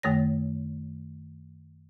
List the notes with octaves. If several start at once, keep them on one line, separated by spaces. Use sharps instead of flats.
F#2 D#3 A3 C#5 A#6